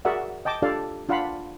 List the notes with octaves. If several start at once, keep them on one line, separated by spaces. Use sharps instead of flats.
F#4 G#4 A#4 D5 E5 F#5
D#5 G5 A5 D6
D4 F4 G4 A4 D5 F5
D4 F4 F5 F#5 B5